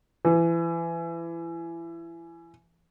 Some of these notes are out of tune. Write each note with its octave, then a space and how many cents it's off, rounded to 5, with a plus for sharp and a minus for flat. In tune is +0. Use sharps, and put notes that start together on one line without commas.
E3 +30